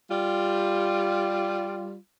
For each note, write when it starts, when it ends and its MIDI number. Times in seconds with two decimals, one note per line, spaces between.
0.10 1.96 55
0.10 1.96 65